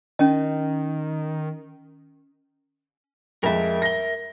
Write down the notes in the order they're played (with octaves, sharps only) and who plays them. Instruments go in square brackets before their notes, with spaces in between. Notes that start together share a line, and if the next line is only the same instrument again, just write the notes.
[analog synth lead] D#3 [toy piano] C#4 D#5
[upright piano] F2 G#3 [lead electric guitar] A#4 E5
[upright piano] A#6 G7